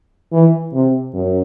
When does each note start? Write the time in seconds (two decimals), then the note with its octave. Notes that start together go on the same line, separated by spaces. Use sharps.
0.32 E3
0.73 C3
1.14 F#2